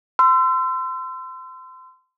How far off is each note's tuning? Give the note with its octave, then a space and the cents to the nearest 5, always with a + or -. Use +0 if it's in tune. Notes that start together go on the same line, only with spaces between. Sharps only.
C6 -30 E6 +30